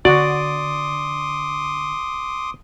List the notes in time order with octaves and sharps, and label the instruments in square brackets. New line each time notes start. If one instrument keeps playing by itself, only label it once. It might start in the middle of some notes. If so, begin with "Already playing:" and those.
[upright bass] D3 [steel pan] F#4 [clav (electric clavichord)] D5 [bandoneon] C6 D6 D#6